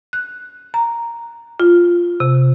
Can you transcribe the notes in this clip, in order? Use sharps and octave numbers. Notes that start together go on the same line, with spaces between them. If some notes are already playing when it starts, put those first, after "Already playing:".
F#6
A#5
F4
C3